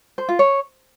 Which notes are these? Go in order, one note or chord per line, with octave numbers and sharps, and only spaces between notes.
C5
F4
C#5